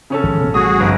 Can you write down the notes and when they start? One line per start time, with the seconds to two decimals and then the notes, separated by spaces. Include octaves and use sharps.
0.10 C#3 C#4 A4
0.24 G#1 D#3 F3
0.41 B2 A#3
0.54 A1 G3 F#4 G#4 D#6
0.80 G1